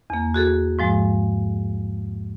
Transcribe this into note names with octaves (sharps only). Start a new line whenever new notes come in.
E2 A#3
F#4 G#4 A4
G#2 F3 G#3